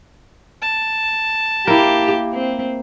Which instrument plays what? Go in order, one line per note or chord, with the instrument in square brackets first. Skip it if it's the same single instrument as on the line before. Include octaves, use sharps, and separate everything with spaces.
[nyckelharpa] A5
[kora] A#3 E4 [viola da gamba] G4
[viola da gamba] C4